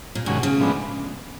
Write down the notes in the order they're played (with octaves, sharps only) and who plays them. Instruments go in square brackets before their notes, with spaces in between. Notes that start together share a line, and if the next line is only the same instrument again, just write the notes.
[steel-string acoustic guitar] A#2
[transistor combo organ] G2 D#3 G#3 C#4 F#4 [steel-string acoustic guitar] B2
[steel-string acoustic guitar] C#3
[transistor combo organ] A2 F3 G#3 B3 D4